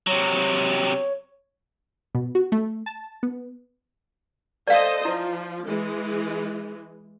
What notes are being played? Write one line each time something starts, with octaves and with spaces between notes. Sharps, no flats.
C3 F#3 C#5
B2
F#4
A3
A5
B3
A4 C5 D5 D#5 F5
F3 E4
E3 G#3